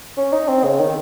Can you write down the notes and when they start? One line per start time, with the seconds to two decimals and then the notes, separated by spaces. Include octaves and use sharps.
0.17 C#4
0.33 D#4
0.48 C4
0.64 C#3
0.80 D#3